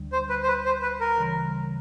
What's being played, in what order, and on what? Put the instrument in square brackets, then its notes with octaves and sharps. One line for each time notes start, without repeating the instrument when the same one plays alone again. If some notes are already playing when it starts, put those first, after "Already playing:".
Already playing: [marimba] D2 D3 G3
[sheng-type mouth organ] C5
B4
C5
B4
C5
B4
A#4
[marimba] C#3 E3 G3